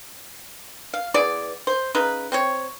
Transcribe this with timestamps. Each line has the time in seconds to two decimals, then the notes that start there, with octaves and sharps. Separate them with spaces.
0.94 F5
1.14 E3 B3 G#4 D5
1.67 C5
1.95 C#3 D#4 B4
2.32 C4 C5 C#5